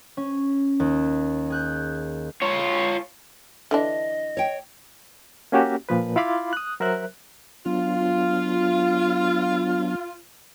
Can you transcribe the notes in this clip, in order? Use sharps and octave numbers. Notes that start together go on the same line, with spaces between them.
C#4
D#2
G#4 F#6 G6
F4 C#5
D3 E3 D4 D#5
C#5 G5
A#3 C#4 F#4 G4
A#2 F3 B4
E4 F4 F5 B5 C6 D6
D#6 F#6
F#3 A#4 C5 E5 F#6
F#3 B3 D4 F4